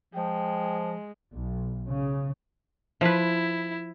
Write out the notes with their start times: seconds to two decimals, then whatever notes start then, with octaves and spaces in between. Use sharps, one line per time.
0.14 F3 G#3 G5
1.32 B1
1.89 C#3
3.01 F3 E4 B4